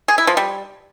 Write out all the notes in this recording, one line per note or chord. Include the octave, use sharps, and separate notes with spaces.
G#4
E4
F3
G3